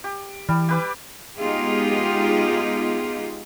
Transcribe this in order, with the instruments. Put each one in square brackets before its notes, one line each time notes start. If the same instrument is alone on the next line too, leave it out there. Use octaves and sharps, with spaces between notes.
[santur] G4
[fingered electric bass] E3 [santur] G3
[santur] G4 B4 D6
[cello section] G#3 B3 D#4 F4 G4 G#4